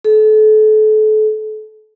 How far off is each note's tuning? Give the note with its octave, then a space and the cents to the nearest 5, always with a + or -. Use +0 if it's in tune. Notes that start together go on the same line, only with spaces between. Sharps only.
A4 -35